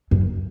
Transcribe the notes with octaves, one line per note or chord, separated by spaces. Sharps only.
F#2